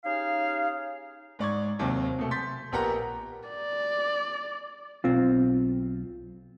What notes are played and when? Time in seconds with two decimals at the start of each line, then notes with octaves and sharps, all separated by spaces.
0.05 C#4 D#4 G4 G#4 F5
1.39 G#2 D5 C#6 G#6
1.79 D#2 C3 F#3 C4
2.19 B2 A3
2.31 C6 G6 A6 B6
2.72 A#1 B3 G4 A#4 F#5 A#5
3.50 D5
5.04 B1 C4 F4